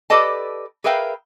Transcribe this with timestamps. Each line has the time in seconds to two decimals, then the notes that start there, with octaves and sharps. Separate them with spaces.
0.10 G4 A4 B4 D5 D#5 A5
0.84 G#4 A#4 B4 E5 F5 G5